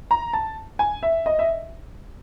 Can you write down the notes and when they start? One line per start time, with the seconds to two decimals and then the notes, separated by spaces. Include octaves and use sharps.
0.11 A#5
0.33 A5
0.79 G#5
1.03 E5
1.26 D#5
1.39 E5